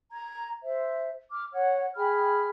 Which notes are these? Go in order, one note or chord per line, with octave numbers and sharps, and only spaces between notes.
A#5 G#6
C5 E5
D6 F6
C#5 F#5
G#4 G5 B5 F6